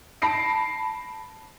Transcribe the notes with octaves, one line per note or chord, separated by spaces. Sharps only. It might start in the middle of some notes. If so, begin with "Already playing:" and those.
A5 B5 A#6 C7 D7